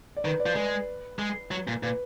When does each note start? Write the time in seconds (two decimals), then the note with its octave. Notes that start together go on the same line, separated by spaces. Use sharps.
0.17 D5
0.25 D#3 B4
0.40 D5
0.46 F3
0.55 G#3 B4
1.19 G#3
1.51 F#3
1.68 A#2
1.83 A#2 B4